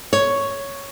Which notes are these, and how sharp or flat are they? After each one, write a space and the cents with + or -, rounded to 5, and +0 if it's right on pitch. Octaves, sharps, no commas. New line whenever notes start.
C#5 +5